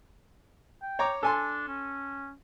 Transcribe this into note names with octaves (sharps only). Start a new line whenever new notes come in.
G5
C#5 A#5 D6
D4 A4 G#5 C6
C#4